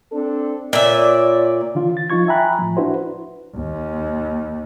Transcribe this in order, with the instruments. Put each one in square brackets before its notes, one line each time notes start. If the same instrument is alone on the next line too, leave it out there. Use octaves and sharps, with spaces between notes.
[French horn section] C4 D4 A4
[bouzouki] A#2 E5 [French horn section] C#5 D5
[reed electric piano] D3 E3 F4
A6
F3 D#4 F4 C#6 G#6
E5 G5 G#5 A#5 B5 F#6
A2 F3
D4 E4 F#4 B4 C5
[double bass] D#2